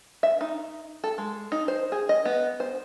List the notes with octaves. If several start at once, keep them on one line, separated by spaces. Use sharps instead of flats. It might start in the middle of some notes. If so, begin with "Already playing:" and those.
E5
D#4
A4
G#3
D#4
C5
G#4
D#5
B3
C5